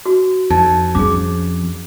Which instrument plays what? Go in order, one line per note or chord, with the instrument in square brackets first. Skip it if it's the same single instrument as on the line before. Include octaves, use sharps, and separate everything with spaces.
[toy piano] F#4
[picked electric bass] F2 [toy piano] D#4
[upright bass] F3 C#4 [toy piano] G#4 D6